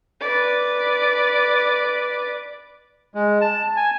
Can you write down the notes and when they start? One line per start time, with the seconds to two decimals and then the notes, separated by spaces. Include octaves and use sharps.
0.21 B4 D5
3.14 G#3
3.41 A5
3.76 G#5